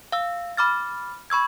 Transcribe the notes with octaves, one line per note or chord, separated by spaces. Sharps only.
F5 E6
B5 D6 F6 A6
B5 C#6 E6 G#6